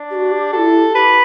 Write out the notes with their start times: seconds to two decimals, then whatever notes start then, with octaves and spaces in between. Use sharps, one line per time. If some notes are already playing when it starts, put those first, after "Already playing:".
Already playing: D4
0.11 G4
0.15 F#4
0.31 G4
0.53 F#4 A4
0.57 E4
0.95 G4 B4